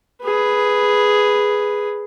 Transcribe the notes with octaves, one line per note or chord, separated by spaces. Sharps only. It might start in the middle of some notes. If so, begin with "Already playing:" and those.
G#4 B4